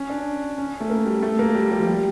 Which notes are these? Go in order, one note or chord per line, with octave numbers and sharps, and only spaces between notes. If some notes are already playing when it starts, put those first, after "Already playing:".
Already playing: C#4
D4
C#4
A3
A#3
G3
A3
A#3
G3
G3
F3
G3